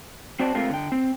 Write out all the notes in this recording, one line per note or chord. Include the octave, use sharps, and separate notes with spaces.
C4 F#4 C5 D5 A5
G#3 A3 C4 F4 G#4 A#4
D3 G5
C4